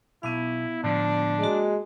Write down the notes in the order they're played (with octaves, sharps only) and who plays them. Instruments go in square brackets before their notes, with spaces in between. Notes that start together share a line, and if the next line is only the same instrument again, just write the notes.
[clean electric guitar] B1 [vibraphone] B3 F5 [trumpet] E4
[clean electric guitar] A2 D3 F3 [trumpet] D4
[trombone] G#3 [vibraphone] A#3 F#4